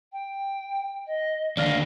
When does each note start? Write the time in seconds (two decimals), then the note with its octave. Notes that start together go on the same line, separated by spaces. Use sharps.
0.12 G5
1.06 D#5
1.57 D#2 D3 D5 F5 F6 A#6